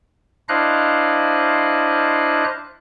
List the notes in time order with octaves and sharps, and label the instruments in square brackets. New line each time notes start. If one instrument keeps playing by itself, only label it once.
[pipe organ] D4 E4 C5 D#5 F5 F#6